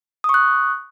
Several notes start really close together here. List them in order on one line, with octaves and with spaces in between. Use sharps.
D#6 C#6 F#6